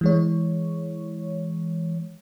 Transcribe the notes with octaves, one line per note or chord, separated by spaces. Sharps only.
E3 G#3 C#5